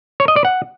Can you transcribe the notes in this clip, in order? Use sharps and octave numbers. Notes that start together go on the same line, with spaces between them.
C#5
D#5
D5
F#5